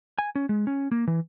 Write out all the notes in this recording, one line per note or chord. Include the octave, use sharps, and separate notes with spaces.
G#5
C#4
G#3
C#4
A#3
E3